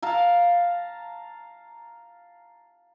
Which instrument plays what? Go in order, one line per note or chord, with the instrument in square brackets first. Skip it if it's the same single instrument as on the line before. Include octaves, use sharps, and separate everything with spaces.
[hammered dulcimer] F5 A5 A#5